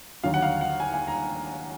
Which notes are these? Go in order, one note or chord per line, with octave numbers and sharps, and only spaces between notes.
D#2 D3 F#3 F5
F#5
F5
F#5
G#5
G#5
A#5